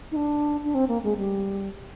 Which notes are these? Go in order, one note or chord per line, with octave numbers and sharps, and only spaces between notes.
D#4
D4
D4
C4
A#3
G#3
G3